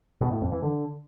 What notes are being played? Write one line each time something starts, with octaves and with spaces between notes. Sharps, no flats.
B2
A2
F2
E3
D3